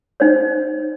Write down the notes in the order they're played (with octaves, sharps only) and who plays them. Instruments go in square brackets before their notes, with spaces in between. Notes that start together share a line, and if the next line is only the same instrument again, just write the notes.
[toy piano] D#4 C5 C#5